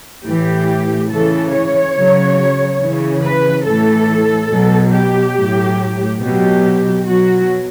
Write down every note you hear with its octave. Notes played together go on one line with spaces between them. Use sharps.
A2 E3 G4
C#3 E3 A4
C#5
C#3 F#3
C#3 E3
B4
A2 E3 A4
B2 F#3
G4
A2 F#3
B2 F#3 G4
B2 F#3 F#4